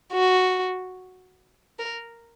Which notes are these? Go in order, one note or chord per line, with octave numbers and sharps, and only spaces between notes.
F#4
A#4